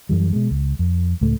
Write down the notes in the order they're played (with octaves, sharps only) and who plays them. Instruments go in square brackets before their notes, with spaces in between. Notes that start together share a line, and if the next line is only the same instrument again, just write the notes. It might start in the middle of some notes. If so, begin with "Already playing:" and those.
[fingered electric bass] F#2 E3 G3
B2 G#3
C#2
F2
C#2 A2 A3